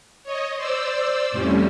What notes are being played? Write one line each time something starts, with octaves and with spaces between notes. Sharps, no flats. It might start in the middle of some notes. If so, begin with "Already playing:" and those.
C#5 D#5
C5 D5 E6
F2 A2 C3 G3 C#4